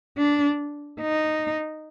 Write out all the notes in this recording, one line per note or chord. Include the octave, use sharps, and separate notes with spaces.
D4
D#4